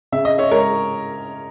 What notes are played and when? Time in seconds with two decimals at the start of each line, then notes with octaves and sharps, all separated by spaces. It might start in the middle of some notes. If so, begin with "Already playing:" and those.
0.12 C#3 E5
0.25 D#5
0.38 C#5 E5
0.51 G#3 A#4 C#5